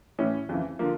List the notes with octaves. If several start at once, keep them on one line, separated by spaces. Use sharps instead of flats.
A2 E3 C#4
F2 C#3 E3
D3 F3 A#3